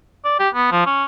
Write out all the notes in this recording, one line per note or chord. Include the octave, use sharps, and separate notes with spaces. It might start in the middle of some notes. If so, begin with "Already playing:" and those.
D5
G4
B3
F3
C#4